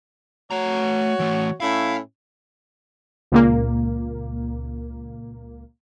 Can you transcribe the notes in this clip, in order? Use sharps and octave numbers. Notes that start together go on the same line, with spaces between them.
A3 F#4 C#5 A#5
E3 A3
A2 C#4 E4 F5
C#2 A#2 A#3